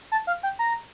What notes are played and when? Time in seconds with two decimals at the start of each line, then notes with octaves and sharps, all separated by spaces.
0.12 A5
0.27 F5
0.43 G5
0.59 A#5